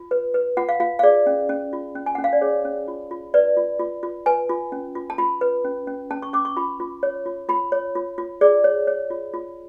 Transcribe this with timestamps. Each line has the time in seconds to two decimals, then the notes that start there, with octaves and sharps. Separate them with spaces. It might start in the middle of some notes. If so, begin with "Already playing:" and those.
Already playing: F4
0.11 B4
0.34 B4
0.57 F4 F#5
0.69 F5
0.80 F4 F5
0.99 F5
1.03 G#4 D5
1.27 C#4
1.49 C#4
1.73 F4
1.95 C#4
2.06 G#5
2.15 C#4 F#5
2.24 F5
2.33 D5
2.41 G#4 C#5
2.65 C#4
2.88 F4
3.11 F4
3.34 B4 D5
3.57 F4
3.80 F4
4.03 F4
4.26 B4 G#5
4.49 F4
4.72 C#4
4.95 F4
5.10 A5
5.18 F4 B5
5.41 B4
5.64 C#4
5.87 C#4
6.11 C#4 A5
6.22 C#6
6.33 C#4 D6
6.45 C#6
6.57 F4 B5
6.80 F4
7.03 C#5
7.26 F4
7.49 F4 B5
7.72 C#5
7.95 F4
8.18 F4
8.41 G#4 D5
8.64 C#5
8.87 C#5
9.10 F4
9.34 F4